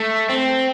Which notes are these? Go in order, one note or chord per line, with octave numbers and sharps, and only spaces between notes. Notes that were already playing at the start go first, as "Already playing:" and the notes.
Already playing: A3
C4